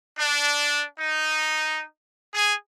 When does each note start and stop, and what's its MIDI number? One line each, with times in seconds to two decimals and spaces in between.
0.18 0.84 62
0.99 1.84 63
2.34 2.54 68